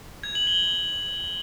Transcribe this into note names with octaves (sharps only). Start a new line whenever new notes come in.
G#6
F#7
G7